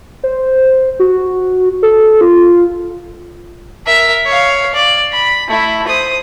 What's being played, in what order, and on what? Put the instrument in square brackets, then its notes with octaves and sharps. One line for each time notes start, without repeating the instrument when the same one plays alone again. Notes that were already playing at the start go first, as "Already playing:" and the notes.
[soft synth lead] C5
F#4
A4
F4
[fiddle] A#4 E5
C#5 F5
D5
B5
A3 E4
C5 D#6